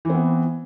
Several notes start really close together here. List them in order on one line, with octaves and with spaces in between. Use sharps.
E3 C4 B3